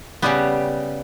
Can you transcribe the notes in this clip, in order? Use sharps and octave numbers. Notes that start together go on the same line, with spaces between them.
C#3 G3 B3 G4